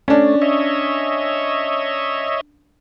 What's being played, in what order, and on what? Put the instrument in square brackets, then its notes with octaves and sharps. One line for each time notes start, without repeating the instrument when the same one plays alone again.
[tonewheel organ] A3 [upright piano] C#4 D4
[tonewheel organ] C#5 D#5 E5